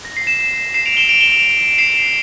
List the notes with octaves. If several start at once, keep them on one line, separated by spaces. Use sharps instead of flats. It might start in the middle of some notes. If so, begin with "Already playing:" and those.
A#6
C7
C7 E7
C7 E7
D7 F7
E7 G7
D7 F7
E7 G7
D7 F7
C7 E7